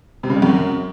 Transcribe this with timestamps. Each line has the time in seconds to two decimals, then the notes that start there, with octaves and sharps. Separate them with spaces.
0.23 C3
0.30 C#3
0.36 G2
0.42 F#2